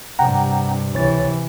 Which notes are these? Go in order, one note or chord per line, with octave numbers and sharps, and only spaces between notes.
G2 C3 F#5 G5 A#5
C#2 C3 E3 C#5 A6